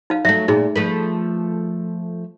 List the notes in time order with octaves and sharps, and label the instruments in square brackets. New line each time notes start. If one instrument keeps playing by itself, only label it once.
[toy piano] D#4 F5
[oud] F#3 A3 [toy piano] E5
[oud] A#2 [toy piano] D#4 G#4
[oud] F3 A3 B4